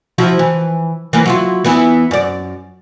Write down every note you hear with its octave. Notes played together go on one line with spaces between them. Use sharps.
F3 E4 F#4
E3
E3 A#3
F#3 E4 F4
E3 B3 E4
F#2 D5